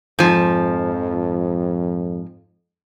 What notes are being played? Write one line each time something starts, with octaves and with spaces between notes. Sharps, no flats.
F2 G#2 F3